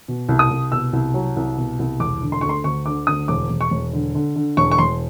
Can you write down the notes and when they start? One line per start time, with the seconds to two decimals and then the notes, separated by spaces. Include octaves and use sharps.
0.08 B2
0.29 C2
0.39 D#6
0.51 C2
0.72 B2 E6
0.93 C2
1.14 F#3
1.37 C2
1.57 B2
1.79 C2
2.00 E1 D6
2.22 D3
2.32 C6
2.41 D2 C#6
2.49 C6
2.64 D2 C#6
2.86 D3 D6
3.07 D2 D#6
3.28 E1 D6
3.50 E1
3.61 C#6
3.71 E1
3.93 D3
4.15 D3
4.36 D3
4.57 E1 C#6
4.72 C#6
4.78 E1 C6